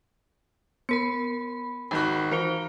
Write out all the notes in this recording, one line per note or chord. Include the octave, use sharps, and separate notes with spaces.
B3 A#4 B5 C#7
G#1 D#3 F#4 B5
E3 A#4 C5 G7